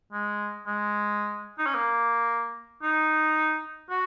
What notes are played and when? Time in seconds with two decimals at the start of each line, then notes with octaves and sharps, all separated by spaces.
0.13 G#3
0.67 G#3
1.59 D#4
1.66 C#4
1.74 A#3
2.83 D#4
3.90 F#4